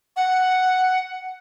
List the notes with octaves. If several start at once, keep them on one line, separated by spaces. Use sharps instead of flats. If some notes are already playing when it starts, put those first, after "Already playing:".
F#5